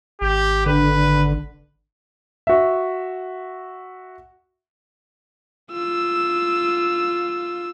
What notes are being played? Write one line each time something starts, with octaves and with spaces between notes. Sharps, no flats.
G#1 G4
D3 B4
F#4 E5
F4 E6